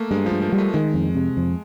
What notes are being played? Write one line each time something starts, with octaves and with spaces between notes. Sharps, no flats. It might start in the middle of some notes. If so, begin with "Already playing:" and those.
Already playing: A3 A#3
G2 G#3
F3
G2
F3
G3
A3
D#3 G#3
F2
C3
F2